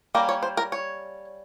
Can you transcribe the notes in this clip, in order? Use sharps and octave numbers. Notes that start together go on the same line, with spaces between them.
G3 A#3 C#4 A#4
C#5
C5
A#4
C#5